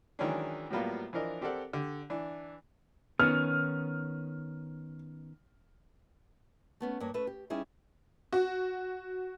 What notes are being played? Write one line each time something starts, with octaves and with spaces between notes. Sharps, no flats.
D#3 E3 F#3 G#3 C#4 D4
A2 F#3 G3 A#3 B3 F4
E3 F3 D4 A#4 D#5
C4 G4 A4 A#4 D5 F#5
D3 G4
E3 D4
D#3 B3 C#4 F6
A3 B3 C#4
G2 A#3 C#5
A3 C#4 A4 B4
G4
G3 C#4 D#4 E4 G#4
F#4